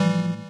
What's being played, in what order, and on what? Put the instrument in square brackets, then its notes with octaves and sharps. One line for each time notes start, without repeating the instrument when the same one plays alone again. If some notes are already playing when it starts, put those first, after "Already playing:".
Already playing: [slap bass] A2 F3 [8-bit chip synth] E3 G3